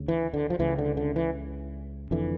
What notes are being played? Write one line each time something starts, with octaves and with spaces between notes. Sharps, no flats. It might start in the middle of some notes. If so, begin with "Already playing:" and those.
Already playing: D2 C#3
E3
D3
F3
C#2 C#3 E3
D3
D3
E3
F1 F2 D3 E3